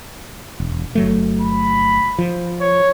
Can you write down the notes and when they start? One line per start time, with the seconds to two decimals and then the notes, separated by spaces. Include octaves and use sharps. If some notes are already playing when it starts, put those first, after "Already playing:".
0.60 E1
0.95 G1 F#3 A3
1.41 B5
2.18 F3
2.61 C#5